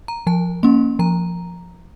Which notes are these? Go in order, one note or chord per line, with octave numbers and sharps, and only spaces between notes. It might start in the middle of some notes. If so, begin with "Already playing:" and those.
A#5
F3 A5
A#3 C#4 C6
F3 A#5